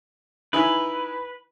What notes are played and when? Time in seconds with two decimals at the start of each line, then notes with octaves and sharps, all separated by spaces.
0.53 D#4 E4 B4 G#5